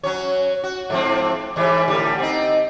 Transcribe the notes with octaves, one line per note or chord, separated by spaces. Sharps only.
F#3 C#4 C#5
F#4
G#2 F3 C4
G#2 E3 G3
A2 D3 G3
C4 D#4